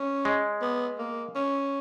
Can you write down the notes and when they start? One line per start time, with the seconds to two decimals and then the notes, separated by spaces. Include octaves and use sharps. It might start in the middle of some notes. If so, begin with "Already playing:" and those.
Already playing: C#4
0.25 G#3
0.62 B3
0.99 A#3
1.35 C#4